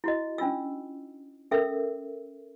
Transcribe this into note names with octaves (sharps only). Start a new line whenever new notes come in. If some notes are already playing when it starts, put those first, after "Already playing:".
E4 F#4 D#5
C#4 D4 F4 E6
C#4 A4 A#4 E5 E6